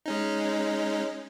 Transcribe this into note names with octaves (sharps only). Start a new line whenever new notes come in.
G#3 C#4 D#4